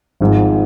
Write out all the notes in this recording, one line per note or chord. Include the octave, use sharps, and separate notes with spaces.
G#1 G#2 F3